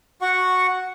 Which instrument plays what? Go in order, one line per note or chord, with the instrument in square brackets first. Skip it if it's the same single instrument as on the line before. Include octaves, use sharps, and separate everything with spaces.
[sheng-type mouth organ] F#4 F#5 C#6